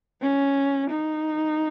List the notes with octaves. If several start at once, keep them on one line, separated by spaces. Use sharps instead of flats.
C#4
D#4